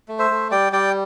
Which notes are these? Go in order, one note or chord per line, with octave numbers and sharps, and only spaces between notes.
A3
C5 E5
A3
G3 D5 G5
G3 D5 G5